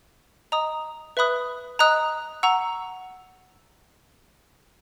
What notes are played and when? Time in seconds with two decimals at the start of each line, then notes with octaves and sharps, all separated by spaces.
0.52 D#5 A#5 D#6
1.17 B4 E5 B5 D#6 F#6
1.79 D#5 A#5 D#6 F#6
2.43 F#5 A#5 C#6 E6